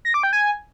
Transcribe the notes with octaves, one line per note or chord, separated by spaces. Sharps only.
A#6
D6
G5
G#5